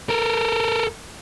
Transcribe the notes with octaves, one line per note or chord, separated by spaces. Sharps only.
A4 A#4